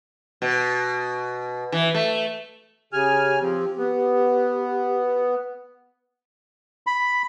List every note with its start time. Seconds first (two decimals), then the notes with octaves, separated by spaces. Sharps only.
0.42 B2
1.72 E3
1.94 A3
2.93 C#3 G4 G#5 F6
3.41 F3 C4
3.78 B3
6.87 B5